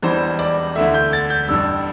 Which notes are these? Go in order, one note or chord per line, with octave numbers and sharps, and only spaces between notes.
E1 E2 E3 G3 C5
D5
D2 D3 A3 E5
G6
A6
G6
A1 G2 G3 E6